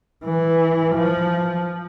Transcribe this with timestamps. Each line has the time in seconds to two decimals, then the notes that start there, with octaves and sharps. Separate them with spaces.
0.24 E3
0.95 F3